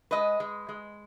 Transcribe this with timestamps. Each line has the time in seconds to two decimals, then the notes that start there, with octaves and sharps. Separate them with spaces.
0.11 G#3 B4 D#5
0.40 G#3
0.69 G#3